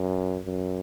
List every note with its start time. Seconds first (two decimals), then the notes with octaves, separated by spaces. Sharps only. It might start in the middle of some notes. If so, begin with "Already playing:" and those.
Already playing: F#2
0.45 F#2